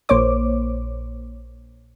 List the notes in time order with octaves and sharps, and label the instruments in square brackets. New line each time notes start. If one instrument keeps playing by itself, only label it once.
[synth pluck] A#1 A#3 C5 C#5 D6